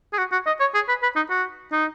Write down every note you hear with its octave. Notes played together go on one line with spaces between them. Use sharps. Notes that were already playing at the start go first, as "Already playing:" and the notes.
G#4
F#4
F#4
D#5
C#5
G#4
B4
B4
D#4
F#4
D#4